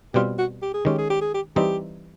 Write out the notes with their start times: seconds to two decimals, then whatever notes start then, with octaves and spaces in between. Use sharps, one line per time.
0.14 B2 G3 C4 F4 G4
0.39 F#4
0.62 G4
0.74 G#4
0.85 D#3 G#3 C#4 G4
0.98 G#4
1.10 G4
1.21 G#4
1.34 G4
1.56 E3 G3 C4 D#4 G4